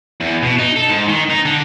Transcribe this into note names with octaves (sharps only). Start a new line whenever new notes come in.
E2
B2
D#4
A4
G#2
D#3
D#4
D3